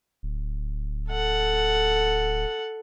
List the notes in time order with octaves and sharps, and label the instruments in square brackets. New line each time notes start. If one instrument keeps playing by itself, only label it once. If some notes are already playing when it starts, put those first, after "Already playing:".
[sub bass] D1
[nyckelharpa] A4 F#5